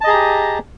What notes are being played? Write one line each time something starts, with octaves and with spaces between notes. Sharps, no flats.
G4 G#4 D#5 A5 A#5